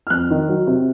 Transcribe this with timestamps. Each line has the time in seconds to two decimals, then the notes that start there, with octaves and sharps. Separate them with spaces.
0.07 F6
0.10 F2 F#6
0.30 D#3
0.49 F#3
0.67 C3